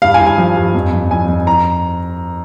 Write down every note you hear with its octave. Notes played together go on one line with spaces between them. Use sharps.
G2 F5
G#5
G2
G#5
F3
G2
F2
F2
F2 G#5
F2
A#5